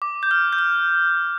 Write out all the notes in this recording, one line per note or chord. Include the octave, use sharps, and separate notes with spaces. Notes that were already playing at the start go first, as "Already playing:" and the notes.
D6
G6
F6
G6
F6